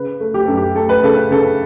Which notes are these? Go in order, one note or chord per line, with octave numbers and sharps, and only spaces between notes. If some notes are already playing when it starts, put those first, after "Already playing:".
Already playing: C#3 B4
A3
G4
F#2 A4
G4
A3 A4
B4
C#3 A4
B4
C#3 A4